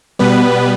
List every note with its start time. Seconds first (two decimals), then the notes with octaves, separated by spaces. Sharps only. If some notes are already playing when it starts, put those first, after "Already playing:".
0.19 B2 G3 B3 B4